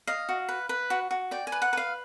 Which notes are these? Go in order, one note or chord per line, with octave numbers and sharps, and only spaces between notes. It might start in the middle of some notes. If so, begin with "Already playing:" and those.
D#5 F5
F#4
B4
B4
F#4
F#4
D5 G5
G#5
B4
F#5
B4 F5